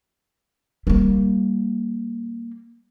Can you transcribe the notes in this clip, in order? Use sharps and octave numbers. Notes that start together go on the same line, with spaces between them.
G3 A#3